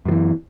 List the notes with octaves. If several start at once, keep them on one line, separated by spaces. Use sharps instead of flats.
F#2 E3 F3